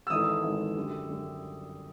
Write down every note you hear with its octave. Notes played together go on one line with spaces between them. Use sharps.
E6
G#1 G#2 E3 A3 D#6
G#1 G#2 E3 A3
F#2 D3 G3
F#2 D3 G3